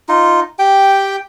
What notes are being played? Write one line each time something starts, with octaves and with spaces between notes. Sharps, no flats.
D#4 F4
G4 G5